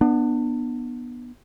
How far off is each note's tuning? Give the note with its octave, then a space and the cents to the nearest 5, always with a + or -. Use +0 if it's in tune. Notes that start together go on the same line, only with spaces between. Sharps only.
B3 -15 D4 +25